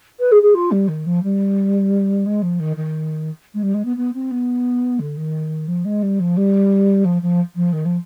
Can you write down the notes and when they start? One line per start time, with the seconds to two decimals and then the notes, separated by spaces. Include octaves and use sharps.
0.19 B4
0.31 G#4
0.42 G#4
0.54 F4
0.71 G3
0.88 D#3
1.06 F3
1.23 G3
2.26 G#3
2.42 F3
2.59 D#3
2.76 D#3
3.54 G#3
3.62 G3
3.74 G#3
3.85 B3
3.96 B3
4.13 C4
4.31 B3
4.99 D3
5.16 D#3
5.67 F3
5.85 G#3
6.02 G3
6.19 F3
6.37 G3
7.04 F3
7.22 F3
7.55 F3
7.72 D#3
7.85 F3